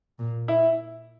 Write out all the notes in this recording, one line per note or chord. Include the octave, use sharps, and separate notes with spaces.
A#2
E4